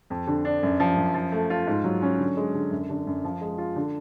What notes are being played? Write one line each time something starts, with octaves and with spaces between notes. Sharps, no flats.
F2
D3
D4
F#2
F3
F#2
F3
A3
F4
G#2
F#3
C#4
D3
G#3
D3
F#2
D3
F#2
F3
G#3
F4
D3